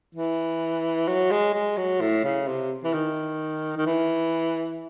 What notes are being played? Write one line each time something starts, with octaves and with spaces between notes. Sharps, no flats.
E3
F#3
G#3
G#3
F#3
A2
C#3
C3
E3
D#3
D#3
E3